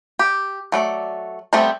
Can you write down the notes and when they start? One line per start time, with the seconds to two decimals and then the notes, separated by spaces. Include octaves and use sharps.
0.19 G4
0.72 F#3 A3 D5
1.53 G3 A3 B3 C4 C5